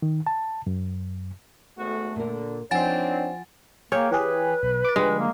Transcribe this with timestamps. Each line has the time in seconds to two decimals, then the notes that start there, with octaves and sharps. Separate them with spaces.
0.02 D#3
0.27 A5
0.67 F#2
1.78 G#1 A3 B3 F#4
2.16 A#2 D3 A#4
2.71 F3 C4 D4 D#4 C#5 F#5 G#5 A6
3.92 A#3 G#4 C#5 F5 G5
4.11 E3 G4 G#4 B4
4.63 B1
4.85 D6 A6
4.96 D3 F3 G3 G#3
5.18 A#3